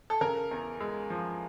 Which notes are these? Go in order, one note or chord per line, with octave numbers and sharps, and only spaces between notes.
A4
C#3 A#4
E2
G#3
F3